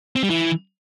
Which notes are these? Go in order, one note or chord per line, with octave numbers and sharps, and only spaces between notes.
C4
G3
E3